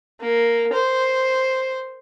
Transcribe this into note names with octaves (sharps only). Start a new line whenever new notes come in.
A#3
C5